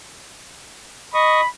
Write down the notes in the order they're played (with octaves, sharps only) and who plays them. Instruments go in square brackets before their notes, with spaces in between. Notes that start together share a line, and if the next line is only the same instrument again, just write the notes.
[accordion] D#5 C#6 D#6 [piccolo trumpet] B5